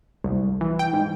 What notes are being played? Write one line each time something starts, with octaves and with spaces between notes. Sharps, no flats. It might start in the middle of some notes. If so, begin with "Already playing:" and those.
C2
E3
G5
G#2